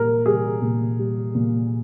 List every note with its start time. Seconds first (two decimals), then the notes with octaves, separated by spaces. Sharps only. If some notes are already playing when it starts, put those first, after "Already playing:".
Already playing: A#2 G3 A#4
0.26 G3 G#4
0.62 A#2
0.99 G3
1.35 A#2